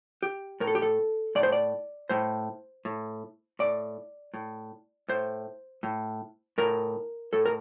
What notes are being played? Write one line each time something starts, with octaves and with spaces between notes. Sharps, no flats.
G4
A2 A#4
A4
G4
A4
A2 D5
C5
D5
A2 C5
A2
A2 D5
A2
A2 C5
A2
A2 A#4
A2 A4
A#4